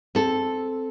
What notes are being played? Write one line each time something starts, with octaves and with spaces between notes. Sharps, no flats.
C4 A4